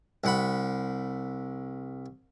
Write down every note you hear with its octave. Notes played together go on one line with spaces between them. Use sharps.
C2 F#5 B5